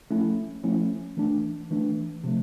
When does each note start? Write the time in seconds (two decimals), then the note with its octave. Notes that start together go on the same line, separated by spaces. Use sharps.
0.11 F3 A3 C#4 E4
0.63 F3 A3 C#4 E4
1.17 E3 A3 D4
1.71 E3 A3 D4
2.24 C3 F3 A3